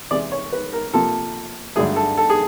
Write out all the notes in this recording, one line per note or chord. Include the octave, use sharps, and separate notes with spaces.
C3 E3 G#3 D5
C#5
B4
A#4
C3 F3 A#3 A4
G2 D3 F#3 A3 G#4
A4
A4
G#4